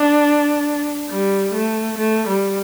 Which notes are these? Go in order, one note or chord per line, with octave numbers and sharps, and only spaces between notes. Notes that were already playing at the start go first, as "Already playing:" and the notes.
Already playing: D4
G3
A3
A3
G3